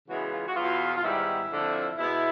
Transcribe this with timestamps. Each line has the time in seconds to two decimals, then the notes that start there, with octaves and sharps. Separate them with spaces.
0.09 C#3 E3 G#3 B3 F#4
0.32 F4
0.47 F#4
0.56 E2 B2 F#3 B3 F4
0.97 F4
1.03 G#2 D#3 G3 B3 E4
1.50 F2 D3 F3
1.97 B2 G#3 B3 E4